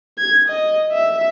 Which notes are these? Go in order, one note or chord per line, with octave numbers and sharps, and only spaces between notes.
G#6
D#5
E5